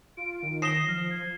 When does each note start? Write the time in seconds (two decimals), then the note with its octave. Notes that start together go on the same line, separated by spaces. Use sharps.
0.17 F4 D7
0.43 D#3
0.62 D#6 A#6 C7 E7 G7
0.88 F3 F6
1.11 G#6